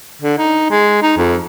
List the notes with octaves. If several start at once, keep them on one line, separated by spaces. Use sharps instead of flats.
D3
D#4
G#3
D#4
F2